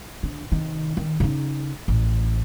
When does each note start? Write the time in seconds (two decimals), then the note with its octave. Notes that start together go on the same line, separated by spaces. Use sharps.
0.23 D3
0.52 C3 D#3
0.97 D#3
1.20 C#3 D#4
1.88 A1